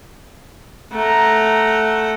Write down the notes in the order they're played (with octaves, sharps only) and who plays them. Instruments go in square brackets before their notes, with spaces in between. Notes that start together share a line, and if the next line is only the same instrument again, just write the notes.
[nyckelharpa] A3 F#5 [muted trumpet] A#5